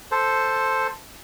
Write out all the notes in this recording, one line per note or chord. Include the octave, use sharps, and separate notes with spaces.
A4 C5